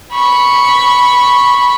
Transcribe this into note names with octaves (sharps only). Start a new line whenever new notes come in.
B5 C#6